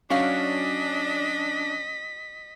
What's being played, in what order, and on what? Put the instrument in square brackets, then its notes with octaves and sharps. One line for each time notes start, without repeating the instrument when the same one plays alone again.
[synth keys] F#3 C#4 [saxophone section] D4 [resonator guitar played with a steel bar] F#4 D5 F5 [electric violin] D#5 B6